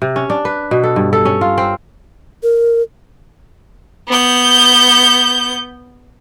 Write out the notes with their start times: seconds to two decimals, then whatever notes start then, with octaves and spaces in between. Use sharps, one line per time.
0.02 C3
0.16 C#4
0.30 D4
0.45 B4
0.71 B2
0.84 A4
0.96 G2
1.13 A4
1.25 C#4
1.41 F4
1.58 C4
2.43 A#4
4.08 B3 G6